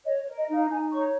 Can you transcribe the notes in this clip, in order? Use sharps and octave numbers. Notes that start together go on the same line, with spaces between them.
C#5 D#5
C#5
A#4
D#5
D#4 F5
D#4 G#5
C#5 C#6